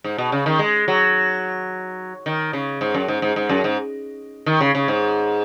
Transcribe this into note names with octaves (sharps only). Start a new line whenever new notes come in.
G#2
B2
C#3
D#3
G#3
F#3
D#3
C#3
G#2
F#2
G#2
G#2
G#2
F#2
G#2
D#3
C#3
C#3
G#2